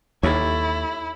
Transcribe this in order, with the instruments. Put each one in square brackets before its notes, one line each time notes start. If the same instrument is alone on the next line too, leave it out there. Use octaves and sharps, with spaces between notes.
[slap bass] D#2 [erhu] E4 [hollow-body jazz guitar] G4 A4 C#5